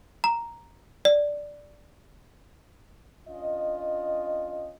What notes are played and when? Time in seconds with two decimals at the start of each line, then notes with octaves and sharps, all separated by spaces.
0.24 A#5
1.05 D5
3.28 C#4 D4 F4 D#5